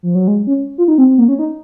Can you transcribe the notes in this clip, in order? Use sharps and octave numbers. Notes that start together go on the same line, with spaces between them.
F3
F#3
G#3
C#4
F4
D#4
C4
C4
A#3
C#4
D#4